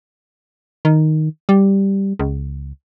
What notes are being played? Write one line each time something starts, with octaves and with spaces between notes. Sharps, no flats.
D#3
G3
C#2